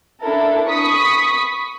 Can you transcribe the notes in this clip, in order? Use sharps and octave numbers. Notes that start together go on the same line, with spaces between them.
D4 E4 A4 A#4
B5 C#6 D#6 B6